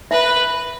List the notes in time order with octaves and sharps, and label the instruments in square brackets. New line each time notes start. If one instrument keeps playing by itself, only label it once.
[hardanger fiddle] B4 [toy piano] E5